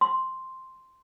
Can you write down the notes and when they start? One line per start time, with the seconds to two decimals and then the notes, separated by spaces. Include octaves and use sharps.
0.01 C6